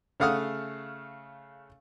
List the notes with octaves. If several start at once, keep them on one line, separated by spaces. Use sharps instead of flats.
C#3 A3 F5 F#5 D#6 F6